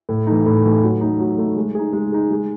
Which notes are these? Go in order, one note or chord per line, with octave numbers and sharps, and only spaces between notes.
A2
E3 A3 D#4
A2
E3 A3 D#4
F#3
A3 D#4
F#3
A3 D#4
G#3
D#4 G#4
G#3
D#4 G#4
G#3